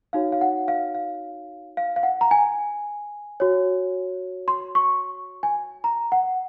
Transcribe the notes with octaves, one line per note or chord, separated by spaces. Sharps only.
D#4 F#4 C#5 F5
F5
F#5
F5
F5
F5
F5
F#5
A#5
G#5
F#4 C#5
C6
C#6
G#5
A#5
F#5